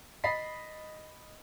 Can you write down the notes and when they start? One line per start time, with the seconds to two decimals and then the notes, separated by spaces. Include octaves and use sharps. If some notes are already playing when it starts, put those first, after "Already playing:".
0.24 D#5 B5 A6 B6 C7